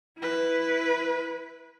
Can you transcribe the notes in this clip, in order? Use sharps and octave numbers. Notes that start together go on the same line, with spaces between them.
E4 B4